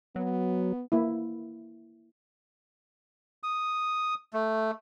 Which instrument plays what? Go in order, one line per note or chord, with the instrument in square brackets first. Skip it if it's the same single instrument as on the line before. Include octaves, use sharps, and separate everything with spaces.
[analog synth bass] F#3 [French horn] B3
[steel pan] A#3 E4
[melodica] D#6
A3